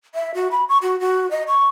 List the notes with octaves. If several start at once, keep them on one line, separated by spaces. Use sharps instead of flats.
E5
F#4
B5
C#6
F#4
F#4
D#5
C#6